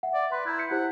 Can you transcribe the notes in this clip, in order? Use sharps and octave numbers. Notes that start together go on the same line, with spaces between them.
E5 F#5
D5
B4 C6
E4 A#5 G6 G#6
G6 B6 C#7
E4 G4 C5 F#5